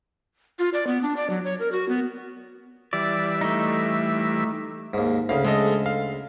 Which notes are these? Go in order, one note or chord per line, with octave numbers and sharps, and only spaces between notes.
F4
D5
B3
D4
D5
F#3
C#5
A#4
F#4
B3
E3 G3 D5 E5
A3 D#4
D#2 G#2
D2 C#3 F5
G#3 A4 D#5
F5